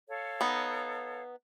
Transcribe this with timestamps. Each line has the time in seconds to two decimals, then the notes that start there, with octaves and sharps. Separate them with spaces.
0.09 A4 C#5 F5
0.41 B3 D#4